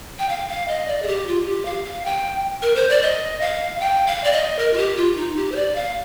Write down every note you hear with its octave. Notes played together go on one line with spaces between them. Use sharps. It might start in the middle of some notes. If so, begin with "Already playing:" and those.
G5
F5
F5
D#5
D5
G#4
G4
F4
G4
F5
F5
G5
A#4
C5
D5
D#5
F5
G5
F5
D5
D#5
A#4
F4
G4
F4
D#4
G4
C5
D5
F5